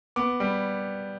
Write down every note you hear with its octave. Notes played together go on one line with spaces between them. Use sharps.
B3 D6
G3